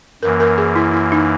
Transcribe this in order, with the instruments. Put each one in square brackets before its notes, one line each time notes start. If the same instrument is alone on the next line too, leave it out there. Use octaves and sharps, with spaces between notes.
[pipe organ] F#2 E3 A#3 [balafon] A#4
[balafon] A#4
G#4
E4
E4
D#4